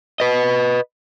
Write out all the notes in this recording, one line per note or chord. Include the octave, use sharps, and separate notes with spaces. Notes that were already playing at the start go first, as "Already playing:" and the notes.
B4 D#5